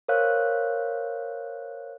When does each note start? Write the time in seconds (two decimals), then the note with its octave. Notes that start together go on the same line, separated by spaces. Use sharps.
0.08 A#4 C5 C#5 F5 F#6